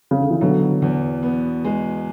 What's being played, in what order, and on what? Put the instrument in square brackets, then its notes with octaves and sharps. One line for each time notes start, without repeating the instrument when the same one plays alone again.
[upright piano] C#3
D3
E3
[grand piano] B2 [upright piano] D3 F#3
[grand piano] E2
B3
G#3